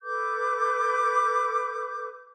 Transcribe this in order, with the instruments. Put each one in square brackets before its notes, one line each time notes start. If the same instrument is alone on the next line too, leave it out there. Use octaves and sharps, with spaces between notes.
[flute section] A4 B4 D6 G6